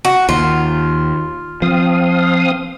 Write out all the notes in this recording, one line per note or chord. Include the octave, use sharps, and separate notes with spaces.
F#4
D#2 F4
F3 C4 F5 D#6